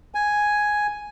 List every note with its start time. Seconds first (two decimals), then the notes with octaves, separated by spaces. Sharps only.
0.14 G#5